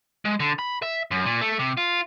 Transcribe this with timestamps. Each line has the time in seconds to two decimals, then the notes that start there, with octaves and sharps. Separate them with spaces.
0.25 G#3
0.40 D3
0.59 B5
0.82 E5
1.11 F#2
1.26 A#2
1.41 A3
1.59 C3
1.77 F4